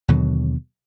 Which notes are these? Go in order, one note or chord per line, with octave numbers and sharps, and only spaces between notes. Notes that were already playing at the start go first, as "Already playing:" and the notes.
D#2 B2 D3 F#3